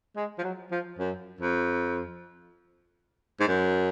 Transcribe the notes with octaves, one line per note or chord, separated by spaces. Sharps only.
G#3
F3
F#3
F3
F#2
F2
G#2
F#2